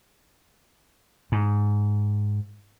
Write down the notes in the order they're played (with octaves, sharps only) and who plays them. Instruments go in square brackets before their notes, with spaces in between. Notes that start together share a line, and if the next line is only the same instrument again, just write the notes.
[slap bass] G#2